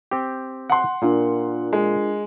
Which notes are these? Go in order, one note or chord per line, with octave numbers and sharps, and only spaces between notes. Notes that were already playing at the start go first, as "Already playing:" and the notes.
C4 G4
F#5 C6
A#2 D4 F4 A#4
G#3